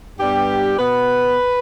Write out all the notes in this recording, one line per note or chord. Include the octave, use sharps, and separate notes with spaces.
G2 G3 B3 G4
B2 B3 B4